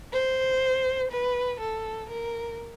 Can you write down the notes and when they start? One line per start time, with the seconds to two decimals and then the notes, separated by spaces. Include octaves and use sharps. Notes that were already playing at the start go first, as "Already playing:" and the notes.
0.13 C5
1.11 B4
1.60 A4
2.10 A#4